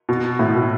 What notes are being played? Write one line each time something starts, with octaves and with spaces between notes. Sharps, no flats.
B2
A2
B2